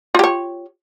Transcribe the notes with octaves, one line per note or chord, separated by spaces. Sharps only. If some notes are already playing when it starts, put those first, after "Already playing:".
F4 G4 C#5